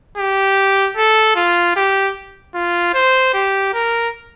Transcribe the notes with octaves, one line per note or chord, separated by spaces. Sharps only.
G4
A4
F4
G4
F4
C5
G4
A#4